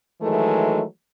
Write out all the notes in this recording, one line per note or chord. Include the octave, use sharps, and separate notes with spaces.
D#3 E3 F#3 G#3 A3